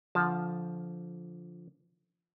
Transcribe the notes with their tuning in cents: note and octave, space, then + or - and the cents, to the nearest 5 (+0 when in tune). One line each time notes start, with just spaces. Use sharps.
D3 -15 F3 +0 A5 +0